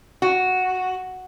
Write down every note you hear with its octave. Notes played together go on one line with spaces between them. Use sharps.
F#4